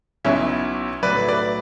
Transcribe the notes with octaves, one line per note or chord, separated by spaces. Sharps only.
B1 B2 F#3 C#4 E4
B1 A2 F#3 B4 D5
B4 D5